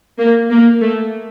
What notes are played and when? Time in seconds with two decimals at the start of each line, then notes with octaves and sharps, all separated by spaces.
0.19 A#3
0.50 A#3
0.81 A3